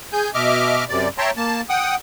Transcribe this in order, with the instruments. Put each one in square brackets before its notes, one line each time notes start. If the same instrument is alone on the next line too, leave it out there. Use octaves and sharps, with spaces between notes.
[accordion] G#4 G#5 G6
B2 D#5 E5 D6 F6
F#2 C3 D5
C#5 E5 G5 A5 A#5 C6
A#3 A5
F#5 G5 D#6